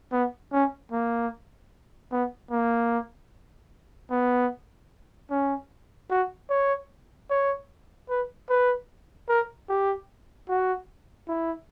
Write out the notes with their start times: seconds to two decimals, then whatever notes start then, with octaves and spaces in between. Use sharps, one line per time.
0.12 B3
0.52 C#4
0.92 A#3
2.12 B3
2.51 A#3
4.11 B3
5.30 C#4
6.10 F#4
6.50 C#5
7.30 C#5
8.10 B4
8.49 B4
9.29 A#4
9.69 G4
10.49 F#4
11.28 E4